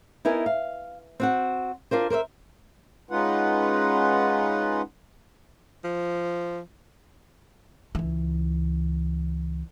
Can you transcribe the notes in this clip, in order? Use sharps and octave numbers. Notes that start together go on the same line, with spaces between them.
B3 D#4 E4 A#4 G#5
F5
C4 F#4 F#5
D4 F4 A#4 C5
A#4 C5 D#5 E5
G#3 C#4 D#4 F4 B4 F#5
F3
C#2 E3